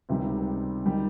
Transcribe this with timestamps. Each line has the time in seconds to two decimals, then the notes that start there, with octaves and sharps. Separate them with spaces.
0.09 C#2 C3 D#3 G3
0.86 D#3 G3